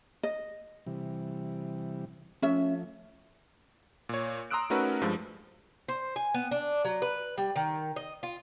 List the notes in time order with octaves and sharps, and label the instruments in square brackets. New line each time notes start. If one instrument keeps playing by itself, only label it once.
[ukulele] D#5
[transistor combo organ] C3 E3 G3
[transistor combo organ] F3 A3 [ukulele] C#4 E5
[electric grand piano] A#2 C#5
A#5 C6 D#6 E6 F#6 D7
A3 C#4 D#4 F#4 A#4 B4
G2 F3 G#3
[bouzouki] C5
G#5
B3
D4
F#3
B4
G3
D#3
D#5
F4